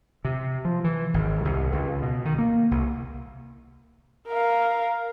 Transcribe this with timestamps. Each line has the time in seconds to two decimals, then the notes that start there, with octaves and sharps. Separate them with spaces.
0.25 C3
0.65 F3
0.84 E3
1.14 G#1
1.45 C2
1.72 C#2
2.02 B2
2.25 D#3
2.38 A#3
2.71 C2
4.27 A#4 F5